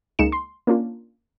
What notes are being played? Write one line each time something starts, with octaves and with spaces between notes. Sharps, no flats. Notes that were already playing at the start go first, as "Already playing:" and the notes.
C#2 G#3 A#3 D#4 C#7 E7
C6
A#3 C#4 D4 F4